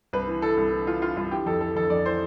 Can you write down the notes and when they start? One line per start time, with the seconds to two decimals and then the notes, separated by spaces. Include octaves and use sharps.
0.13 C2 B4
0.28 E3
0.42 E3 A4
0.57 C2
0.72 E3
0.87 E3 F4
1.02 E3 F4
1.16 C2 F4
1.31 E3 G4
1.46 F2 A4
1.61 E3 A4
1.75 F2 A4
1.90 F2 D5
2.05 E3 C5